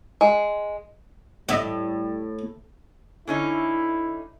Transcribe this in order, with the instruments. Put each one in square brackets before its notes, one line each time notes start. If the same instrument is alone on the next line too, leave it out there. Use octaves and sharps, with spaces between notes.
[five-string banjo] G#3
[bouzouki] A2 [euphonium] G3 [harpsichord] D#5 E5 F#5
[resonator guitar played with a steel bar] D3 C#4 D#4 [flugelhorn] E4